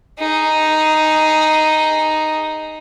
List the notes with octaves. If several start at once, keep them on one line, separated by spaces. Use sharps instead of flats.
D#4 G#4